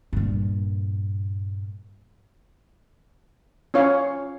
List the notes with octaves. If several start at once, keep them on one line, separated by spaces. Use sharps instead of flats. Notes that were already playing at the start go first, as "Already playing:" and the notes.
G2 A#2
C#4 F4 C#5 F5